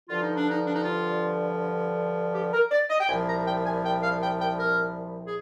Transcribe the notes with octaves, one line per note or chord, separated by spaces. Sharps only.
G2 D3 F3 F4
D#4
D4
D#4
D4
D#4
F4
G4
A#4
D5
D#5
G5
C2 A#2 F3 G#5
A#5
G5
G#5
G5
F5
G5
G5
A#4
G#4